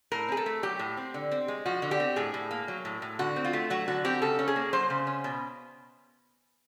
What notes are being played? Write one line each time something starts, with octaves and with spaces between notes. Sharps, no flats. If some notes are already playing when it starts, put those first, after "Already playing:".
A2 A#4
C4 G#4
A4
A3
F#3 G4
A2
C4
D3
C4
G#3
F3 F#4
D3
G4
C4
A2 G#4
A2
A#3
F#3
A2
A2
D3 F#4
C4
F4
A3
F#3 F#4
D3 F#4
C4 G4
C#3 A4
C#4
G#4
A#3
F#3 C5
C#3
C#4
B2